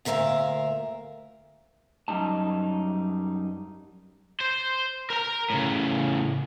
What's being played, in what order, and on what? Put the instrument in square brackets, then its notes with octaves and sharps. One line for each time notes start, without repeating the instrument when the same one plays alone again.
[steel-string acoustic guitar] D2 A#2 A#4 E5 F5
[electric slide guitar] F#2 G3 D#4 A5
[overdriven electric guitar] C5
A#4 A#5
A2 C#3